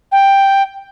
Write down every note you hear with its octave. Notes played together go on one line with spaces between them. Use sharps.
G5